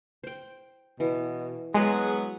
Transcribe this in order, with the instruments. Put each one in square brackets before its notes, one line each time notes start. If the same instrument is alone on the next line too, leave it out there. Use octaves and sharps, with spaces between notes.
[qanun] C5 G5
[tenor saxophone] B2 [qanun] E3
[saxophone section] F#3 B3 [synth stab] G#3 [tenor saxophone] G#4